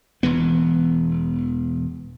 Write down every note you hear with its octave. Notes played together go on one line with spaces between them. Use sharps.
E1 E3 B3